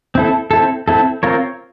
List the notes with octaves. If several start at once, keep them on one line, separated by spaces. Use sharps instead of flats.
C4 E4 A4
C4 E4 A4
C4 E4 A4
C4 F4 A#4 C#5